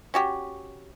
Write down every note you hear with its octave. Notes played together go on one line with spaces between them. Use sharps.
C#4 F#4 G4